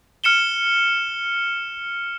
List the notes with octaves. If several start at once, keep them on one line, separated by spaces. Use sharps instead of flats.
F6 C#7 E7 G7